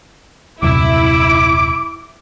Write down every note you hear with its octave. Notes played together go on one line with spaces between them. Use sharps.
D#1 F#2 C3 E4 D6